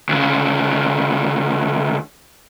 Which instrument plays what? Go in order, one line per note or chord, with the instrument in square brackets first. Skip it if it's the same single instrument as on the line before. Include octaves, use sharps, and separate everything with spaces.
[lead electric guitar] D2 C#3